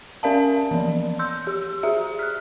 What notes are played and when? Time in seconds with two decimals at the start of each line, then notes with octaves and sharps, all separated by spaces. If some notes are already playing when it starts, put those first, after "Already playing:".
0.23 C#4 A#4 D5 F5 A5
0.71 E3 F3
1.19 C6 E6 G6
1.47 G4
1.83 F#4 G#4 E5
2.19 F6 F#6